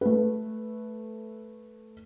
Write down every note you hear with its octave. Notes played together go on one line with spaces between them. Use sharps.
A3 B4